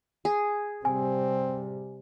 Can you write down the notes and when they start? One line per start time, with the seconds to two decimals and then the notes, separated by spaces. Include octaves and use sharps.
0.25 G#4
0.85 C3 G3 C4 G#5